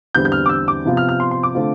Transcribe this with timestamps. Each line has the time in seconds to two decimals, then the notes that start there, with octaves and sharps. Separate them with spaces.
0.15 E2 D3 G3 C4 G6
0.25 G6
0.32 F6
0.46 D6
0.49 E6
0.68 D6
0.85 C3 F3 B3 F4
0.97 F6
1.09 F6
1.20 C6
1.31 C6
1.43 D6
1.55 D3 A3 C4 F4